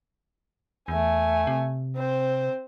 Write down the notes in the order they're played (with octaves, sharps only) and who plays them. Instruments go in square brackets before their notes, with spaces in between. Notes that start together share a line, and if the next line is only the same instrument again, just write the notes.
[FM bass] E2 [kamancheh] A3 G#5
[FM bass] C3
[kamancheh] C4 C5